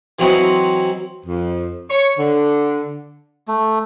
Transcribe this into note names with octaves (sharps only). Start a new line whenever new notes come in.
E3 F#3 C4 D#4 E4 F#4
F2
C#5
D3
A3